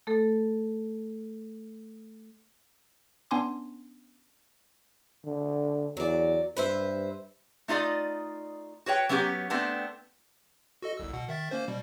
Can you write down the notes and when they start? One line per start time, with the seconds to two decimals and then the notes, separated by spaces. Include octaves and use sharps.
0.07 A3 A4
3.31 B3 C#4 D4 G#5 C6 D6
5.26 D3
5.97 E2 F#3 D5
6.57 G2 B4 C5 E5
7.68 A3 D#4 F4 D5 D#5
8.86 F#4 B4 C#5 G5
9.09 F#3 B3 C#4 E4 G4
9.50 A3 B3 C4 D4
10.82 F#4 A4 D#5
10.97 G1 C2 E6
11.13 B2 F#5
11.29 D#3 E5 A6
11.51 A#3 C#4 C5
11.68 B2 G3